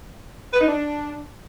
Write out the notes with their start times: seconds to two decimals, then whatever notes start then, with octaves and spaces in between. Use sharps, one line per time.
0.53 B4
0.61 D#4
0.68 D4